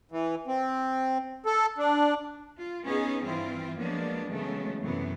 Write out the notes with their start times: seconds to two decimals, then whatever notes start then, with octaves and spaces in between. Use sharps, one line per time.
0.12 E3
0.47 C4
1.46 A4
1.78 D4
2.55 F4
2.84 B3 C#4 D#4 G#4
3.23 G2 E3 C4 E4 F4
3.78 F3 F#3 G#3 A#3 B3 D4
4.28 C#3 E3 F#3 G#3 A3 B3
4.81 F#2 C3 E3 F#3 A3 B3